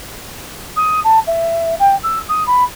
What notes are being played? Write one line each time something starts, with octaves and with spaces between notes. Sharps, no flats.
D#6
A5
E5
G5
E6
D#6
B5